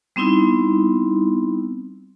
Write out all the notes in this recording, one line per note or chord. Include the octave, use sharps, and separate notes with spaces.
G3 B3 C4 D#4 E4